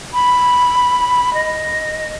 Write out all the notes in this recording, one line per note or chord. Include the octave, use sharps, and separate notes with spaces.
B5
D#5